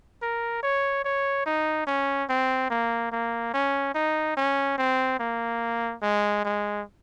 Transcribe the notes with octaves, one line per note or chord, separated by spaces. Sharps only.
A#4
C#5
C#5
D#4
C#4
C4
A#3
A#3
C#4
D#4
C#4
C4
A#3
G#3
G#3